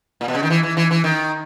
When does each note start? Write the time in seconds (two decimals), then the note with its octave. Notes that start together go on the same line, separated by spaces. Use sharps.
0.21 A#2
0.28 B2
0.35 C#3
0.43 D#3
0.50 E3
0.63 E3
0.77 E3
0.91 E3
1.04 D#3